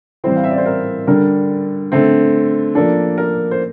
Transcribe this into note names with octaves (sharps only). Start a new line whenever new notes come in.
E3 G3 C4 E4 C5
F5
E5
D5
C5
A#4
D3 G3 D4 A#4
D3 A3 C4
F3 A#3 D4 A4
A#4
C5